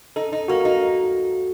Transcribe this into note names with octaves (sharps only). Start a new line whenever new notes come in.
D#4 A4
D#4
A#3 F#4
D#4